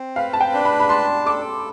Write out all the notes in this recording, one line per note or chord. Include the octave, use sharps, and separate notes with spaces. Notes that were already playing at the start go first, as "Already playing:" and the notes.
Already playing: C4
B4 F5
A5
G5
D4
B5
B5
A5 C6
A4 D6